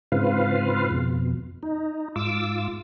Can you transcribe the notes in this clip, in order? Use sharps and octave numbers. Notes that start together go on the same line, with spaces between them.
G#2 C#3 C4 F4 B4 F5
F2 B2
D#4
G#2 F4 D6 E6